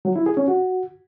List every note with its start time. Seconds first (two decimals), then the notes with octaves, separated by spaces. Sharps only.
0.05 F#3
0.16 E4
0.26 G#4
0.37 C#4
0.48 F#4